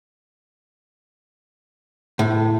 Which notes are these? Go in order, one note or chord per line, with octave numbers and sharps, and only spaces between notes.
A2